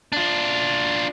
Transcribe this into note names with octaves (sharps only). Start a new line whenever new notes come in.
D4 F4